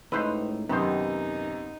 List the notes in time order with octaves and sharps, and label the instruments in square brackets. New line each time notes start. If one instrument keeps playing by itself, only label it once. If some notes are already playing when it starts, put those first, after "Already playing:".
[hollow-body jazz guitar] C#2 A2 D#4 [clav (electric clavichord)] B4 C5 [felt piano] E6
[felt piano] F#2 C3 [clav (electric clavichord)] D#3 C5 [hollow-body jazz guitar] B3 [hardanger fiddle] D#4